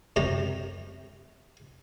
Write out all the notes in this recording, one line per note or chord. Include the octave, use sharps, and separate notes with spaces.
F#2 C3 G4 A#5